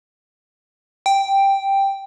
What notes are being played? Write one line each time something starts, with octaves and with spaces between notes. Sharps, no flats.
G5